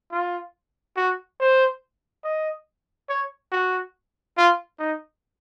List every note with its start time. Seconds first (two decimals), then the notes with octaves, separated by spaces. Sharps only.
0.12 F4
0.97 F#4
1.40 C5
2.24 D#5
3.09 C#5
3.52 F#4
4.37 F4
4.79 D#4